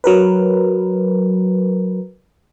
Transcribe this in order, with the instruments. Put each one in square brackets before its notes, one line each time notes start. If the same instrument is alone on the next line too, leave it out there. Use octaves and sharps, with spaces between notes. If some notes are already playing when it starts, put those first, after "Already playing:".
[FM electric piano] F#3 A#4 B4